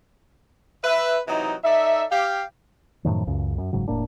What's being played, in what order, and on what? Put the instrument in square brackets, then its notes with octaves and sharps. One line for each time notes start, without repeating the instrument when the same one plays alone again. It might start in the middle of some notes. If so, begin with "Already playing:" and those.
[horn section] B4 E5
C3 E3 F#3 D#4
D#4 A4 D5 E5
G4 F5
[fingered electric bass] F#2 A2 D#3 F3
C#2 F#2 C#3
F#2
F#1 G#2 C#3 F#3
E1 A2 A#3 D4